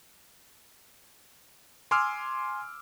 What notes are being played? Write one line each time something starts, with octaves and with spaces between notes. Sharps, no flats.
G#5 C6 D6 E6 F6